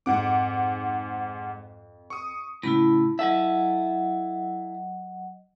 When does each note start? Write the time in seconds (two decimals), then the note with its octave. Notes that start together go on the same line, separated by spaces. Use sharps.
0.06 F2 G#2 F#5 D6
2.10 C#6 D#6
2.63 A2 C#3 E4 A5 B5
3.19 F#3 E4 A4 D#5 E5 F#5